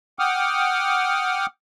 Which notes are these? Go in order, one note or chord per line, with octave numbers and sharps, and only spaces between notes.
F#5 G5 D6 D#6 F6